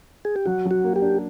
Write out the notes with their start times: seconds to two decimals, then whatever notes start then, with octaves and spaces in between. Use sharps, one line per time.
0.25 G#4
0.36 G4
0.46 F#3 F#4
0.65 F#3
0.71 F#4
0.84 A#3
0.96 G4
1.02 D4